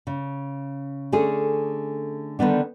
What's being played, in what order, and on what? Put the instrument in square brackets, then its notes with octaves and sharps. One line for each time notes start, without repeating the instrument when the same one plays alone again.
[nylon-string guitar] C#3
D3 A3 C#4 G#4
D3 D#3 G3 B3 D4